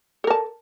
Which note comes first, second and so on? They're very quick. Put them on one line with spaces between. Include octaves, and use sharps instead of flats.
A4 A#4 A5